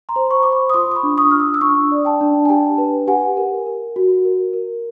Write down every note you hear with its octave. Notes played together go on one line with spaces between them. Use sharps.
A#5 C6
C5
B5 C#6
C5 D6
B5 C#6
D#6
F4 C6 D6
D6
B5 C#6
D4
C#6 D#6
F4 F6
D6 E6
E6
D4 C#6 D#6
D5
G5 A5
D4
G#5
G4 G5 A5
B4
G4 F#5 G#5
A#4
A#4
F#4
A#4
A#4